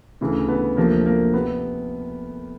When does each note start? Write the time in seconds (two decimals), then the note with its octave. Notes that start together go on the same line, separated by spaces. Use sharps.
0.21 D2 C#3 E3
0.48 B3
0.77 D2 C3 F3 A#3
1.06 A#3
1.34 C3 B3